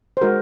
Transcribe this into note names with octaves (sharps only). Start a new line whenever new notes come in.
C5
G#3 D#4 F#4 A#4